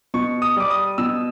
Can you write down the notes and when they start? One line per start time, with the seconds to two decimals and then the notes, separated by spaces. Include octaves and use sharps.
0.14 B2 C#6
0.42 D#6
0.57 G3 D6
0.70 D#6
0.98 B2 E6